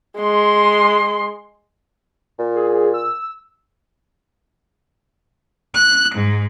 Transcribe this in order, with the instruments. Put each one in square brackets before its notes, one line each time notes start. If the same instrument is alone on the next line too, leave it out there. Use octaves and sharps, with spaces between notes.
[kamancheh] G#3 C6
[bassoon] A#2
[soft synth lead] G#4
E6
[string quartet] F#6
G#2